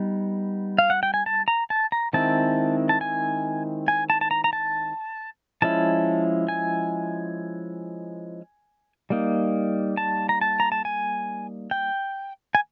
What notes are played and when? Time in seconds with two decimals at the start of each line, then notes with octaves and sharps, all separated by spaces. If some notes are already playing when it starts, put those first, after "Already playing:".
Already playing: G3 B3 D#4
0.78 F5
0.90 F#5
1.03 G5
1.14 G#5
1.26 A5
1.48 A#5
1.70 A5
1.92 A#5
2.13 D#3 G#3 C4 E4 A5
2.89 A5
3.01 G#5
3.88 G#5
4.10 A5
4.21 A5
4.31 A#5
4.44 A#5
4.53 A5
5.62 F3 G#3 C#4 E4 A5
6.48 G#5
9.10 G3 A#3 D#4
9.97 A5
10.29 A#5
10.41 A5
10.60 A#5
10.72 A5
10.85 G#5
11.71 G5
12.55 G#5